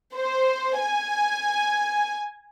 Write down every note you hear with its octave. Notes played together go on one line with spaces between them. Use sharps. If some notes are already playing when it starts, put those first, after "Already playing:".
C5
G#5